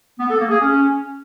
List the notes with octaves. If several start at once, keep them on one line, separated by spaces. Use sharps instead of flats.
B3
A4
A#3
G#4
C#4